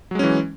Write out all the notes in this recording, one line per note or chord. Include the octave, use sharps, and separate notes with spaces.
E3 F#3 G#3 C#4